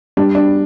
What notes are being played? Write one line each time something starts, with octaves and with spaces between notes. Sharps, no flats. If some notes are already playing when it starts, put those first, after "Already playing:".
G3 D4
D4